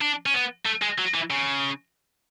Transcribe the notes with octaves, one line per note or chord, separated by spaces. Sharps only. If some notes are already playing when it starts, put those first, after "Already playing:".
D4
C#4
B3
A3
G#3
F#3
E3
C#3